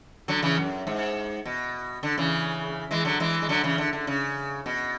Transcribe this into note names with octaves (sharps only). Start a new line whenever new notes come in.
D3 F#3
C#3 E3
F#2
G#2
B2
D3
C#3 E3
E3 G#3
D3 F#3
E3 G#3
G#3
D3 F#3
C#3 E3
D3
D3
C#3
B2